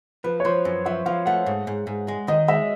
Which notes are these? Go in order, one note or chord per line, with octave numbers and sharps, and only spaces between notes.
F3 B4
C#5
F3 C5
F#2
F3 E5
F3 F5
A3 F#5
G#2
G#2
G#2
G#3
D#3 D#5
G#3 E5